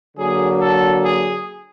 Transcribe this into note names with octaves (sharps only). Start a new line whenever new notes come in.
D3 F#3 A#3 G#4
A4
G#4